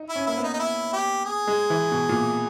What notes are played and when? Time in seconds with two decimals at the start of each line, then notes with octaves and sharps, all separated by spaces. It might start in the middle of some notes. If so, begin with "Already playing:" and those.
Already playing: D#4
0.09 E4
0.16 C#4
0.26 A#3 E4
0.37 B3
0.43 D#4
0.54 D#4
0.59 E4
0.93 G4
1.26 G#4
1.47 G#3
1.70 E3
1.92 B2
2.09 A#2